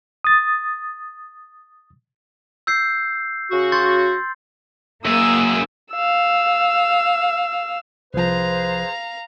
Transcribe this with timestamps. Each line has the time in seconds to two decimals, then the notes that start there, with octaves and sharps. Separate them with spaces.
0.24 D#6 A6
2.67 E6 G6 C7
3.50 C#3 F#4
3.72 C6 G6 A6
5.05 F#2 A#3 G#4 E6
5.92 F5 E6
8.14 C2 F3 G#4 B4 C5 F5 A#5